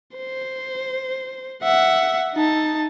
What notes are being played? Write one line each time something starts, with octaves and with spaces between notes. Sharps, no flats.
C5
E5 F#5
D#4 A5